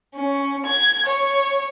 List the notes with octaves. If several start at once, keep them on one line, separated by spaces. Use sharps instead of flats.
C#4
G#6
C#5